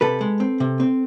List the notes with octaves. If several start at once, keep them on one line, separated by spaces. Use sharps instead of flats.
C3 A4 B4
G#3
C4
C3
C4